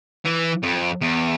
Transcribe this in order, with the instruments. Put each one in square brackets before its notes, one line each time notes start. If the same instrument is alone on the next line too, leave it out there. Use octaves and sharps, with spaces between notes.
[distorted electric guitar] E3
F2
E2